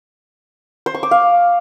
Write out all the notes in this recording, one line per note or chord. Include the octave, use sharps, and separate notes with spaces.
C5
C#6
D6
F5